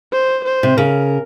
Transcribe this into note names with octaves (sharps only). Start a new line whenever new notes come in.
C5
C5
C3
C#3 A#4